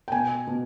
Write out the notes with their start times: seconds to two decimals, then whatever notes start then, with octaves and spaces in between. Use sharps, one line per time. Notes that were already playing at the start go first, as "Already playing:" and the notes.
0.08 G5
0.12 B2 G#5
0.47 B2